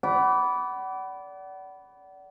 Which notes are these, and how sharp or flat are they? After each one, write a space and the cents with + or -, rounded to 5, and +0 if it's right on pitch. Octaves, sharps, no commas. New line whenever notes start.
D5 -25 F#5 +35 B5 +0